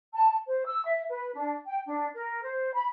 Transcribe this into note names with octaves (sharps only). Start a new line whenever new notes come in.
A5
C5
E6
E5
B4
D4
G5
D4
A#4
C5
B5